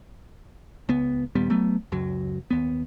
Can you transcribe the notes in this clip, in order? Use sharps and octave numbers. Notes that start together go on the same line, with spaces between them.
C#2 B3
D#2 A#2 G3 B3
F#3 A3 B3
C#2 F#2 F#3
D#2 B3